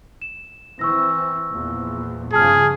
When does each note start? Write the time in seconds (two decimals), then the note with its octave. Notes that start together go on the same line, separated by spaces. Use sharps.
0.22 E7
0.79 E3 C4 C#6 E6 A#6
1.49 E2 A#2 F3
2.33 G1 C#3 F3 G#4 A5 F6